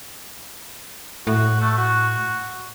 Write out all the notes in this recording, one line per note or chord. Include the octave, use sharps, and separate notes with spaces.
A2 F#4
A3
F#4